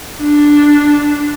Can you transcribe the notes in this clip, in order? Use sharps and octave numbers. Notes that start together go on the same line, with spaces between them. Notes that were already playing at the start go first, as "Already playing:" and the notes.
D4